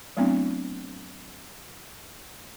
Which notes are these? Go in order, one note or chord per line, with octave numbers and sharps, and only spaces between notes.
F#3 A3 B3 C4 D4 E4